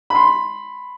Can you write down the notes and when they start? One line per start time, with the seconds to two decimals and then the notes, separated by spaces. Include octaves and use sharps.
0.10 B5 C6